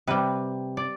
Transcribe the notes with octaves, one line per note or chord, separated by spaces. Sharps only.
C3 G3 B4
D5